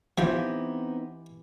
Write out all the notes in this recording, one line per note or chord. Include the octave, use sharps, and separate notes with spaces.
E3 F3 B3 C4 D#4 G4 G5